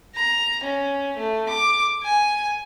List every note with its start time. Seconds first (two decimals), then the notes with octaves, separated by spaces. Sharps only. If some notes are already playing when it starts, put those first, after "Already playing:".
0.16 A#5
0.63 C#4
1.17 A3
1.49 D6
2.03 G#5